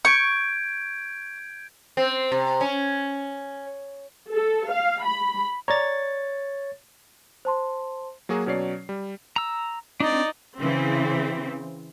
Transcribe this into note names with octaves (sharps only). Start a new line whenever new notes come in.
C#6 G6 G#6 D7
C4
C3
C#4
A4
F5
B5
C#5 D5 A#5 A6
C5 A5 C6
F#3 A#3 F#4 G#4
B2 F#3 C#4 C#5 D5 C7
G3
A#5 E6
C4 D4 D#4 D5
C#3 E3 C4